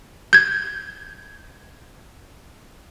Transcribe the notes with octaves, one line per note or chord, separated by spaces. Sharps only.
G6 G#6